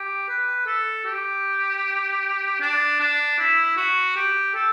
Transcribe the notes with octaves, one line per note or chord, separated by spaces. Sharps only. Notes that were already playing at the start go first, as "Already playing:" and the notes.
Already playing: G4
B4
A4
G4
D4
D4
E4
F#4
G4
A4